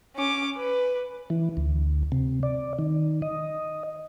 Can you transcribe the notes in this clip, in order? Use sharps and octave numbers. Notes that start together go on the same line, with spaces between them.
C#4 D6
B4
E3
D2
C3
D5
D#3
D#5